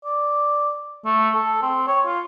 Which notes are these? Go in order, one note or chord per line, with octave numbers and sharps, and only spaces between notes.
D5
A3
A4
C4
C#5
F4